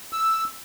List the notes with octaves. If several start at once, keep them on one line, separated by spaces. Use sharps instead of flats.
E6